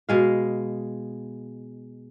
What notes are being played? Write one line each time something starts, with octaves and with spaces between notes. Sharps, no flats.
B2 G#3 F5